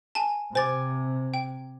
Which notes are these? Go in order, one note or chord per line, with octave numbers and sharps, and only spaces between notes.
G#5 A5
C3 C5 G#5 D6 A6
G5